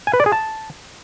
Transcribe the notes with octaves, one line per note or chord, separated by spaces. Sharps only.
G#5
B4
D5
G#4
A5